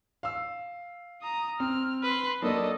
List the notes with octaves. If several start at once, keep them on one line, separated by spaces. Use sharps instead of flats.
F5 E6
A#5 D#6
C4 F6
B4 C6
F#3 A#3 D4 A4 D#5